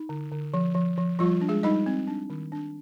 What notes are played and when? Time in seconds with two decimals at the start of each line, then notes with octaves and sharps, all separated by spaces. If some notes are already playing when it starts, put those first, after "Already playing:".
Already playing: D#4
0.09 D3
0.31 D3
0.54 F3
0.75 F3
0.98 F3
1.19 F3 G3 F4
1.41 D4
1.49 G#3 G#4
1.63 G3 D#4 D#5
1.86 C4
2.07 D4
2.30 D#3
2.52 D4